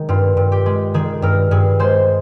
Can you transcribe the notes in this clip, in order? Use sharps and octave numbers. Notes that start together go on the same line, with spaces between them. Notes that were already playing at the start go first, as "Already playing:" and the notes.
Already playing: D#3 G#3 D#4
G2 F4
G2
G4
G#3
D#3 G#4
G2 A#4
G2 G#4
G#3 C5